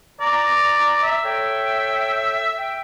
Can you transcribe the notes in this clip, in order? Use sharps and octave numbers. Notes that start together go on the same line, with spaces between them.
D5 A#5
E5
A4 C#5 G5
G5